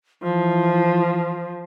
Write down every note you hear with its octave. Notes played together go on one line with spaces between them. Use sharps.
E3 F3